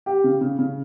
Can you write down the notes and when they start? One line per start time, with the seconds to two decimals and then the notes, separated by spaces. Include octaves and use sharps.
0.06 G4
0.24 C#3
0.41 C#3
0.59 C#3